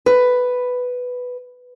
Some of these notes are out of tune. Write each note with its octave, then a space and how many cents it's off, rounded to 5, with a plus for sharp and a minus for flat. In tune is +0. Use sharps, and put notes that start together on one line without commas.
B4 +5